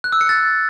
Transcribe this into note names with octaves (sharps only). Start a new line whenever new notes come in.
F#6
E6
C#7
A6